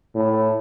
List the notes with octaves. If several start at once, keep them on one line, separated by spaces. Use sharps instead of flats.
A2